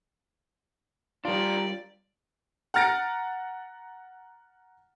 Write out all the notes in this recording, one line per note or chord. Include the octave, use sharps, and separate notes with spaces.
G3 D4 F4 A#4 D5
F#5 A#5 F6 A6 A#6 D7